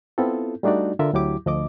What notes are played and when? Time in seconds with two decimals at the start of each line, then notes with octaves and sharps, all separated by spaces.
0.18 B3 C4 E4 F4 A4
0.63 G3 A3 D4 D#4 F#4 D5
0.99 D3 F4 A#4 E5
1.13 D2 F#3 E4 G4 D6
1.46 D2 F3 D#5 D6